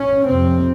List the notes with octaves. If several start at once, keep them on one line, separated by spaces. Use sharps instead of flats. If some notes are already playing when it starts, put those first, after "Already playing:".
Already playing: C#4
F2 C3 C4